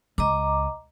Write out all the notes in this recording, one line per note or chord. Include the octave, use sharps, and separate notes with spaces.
C#2 D#5 A#5 D6